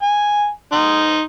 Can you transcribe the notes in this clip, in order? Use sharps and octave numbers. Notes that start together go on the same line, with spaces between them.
G#5
D#4 C6